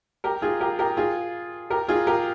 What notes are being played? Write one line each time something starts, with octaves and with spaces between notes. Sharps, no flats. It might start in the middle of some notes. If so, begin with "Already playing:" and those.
G4 A#4
F4 G#4
G4 A#4
G4 A#4
F4 G#4
G4 A#4
F4 G#4
G4 A#4